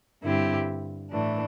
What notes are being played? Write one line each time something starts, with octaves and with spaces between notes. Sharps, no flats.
G2 D3 C4 E4 G4
A2 E3 A3 D4